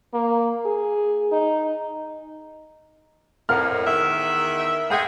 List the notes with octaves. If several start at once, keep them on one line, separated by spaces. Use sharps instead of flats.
A#3
G#4
D#4
F2 A2 A#4 F#5 F6
E2 D#3 E5
G#3 A3 G#4 F#5 G5 G6